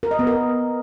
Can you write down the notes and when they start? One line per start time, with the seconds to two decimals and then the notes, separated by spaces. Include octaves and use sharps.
0.03 A#4
0.11 D#5
0.19 B3
0.27 A#4